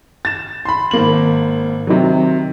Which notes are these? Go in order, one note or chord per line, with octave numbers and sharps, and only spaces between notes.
A6 E7
B5 C6
G#1 A#3 F#7
C3 D#3 F#3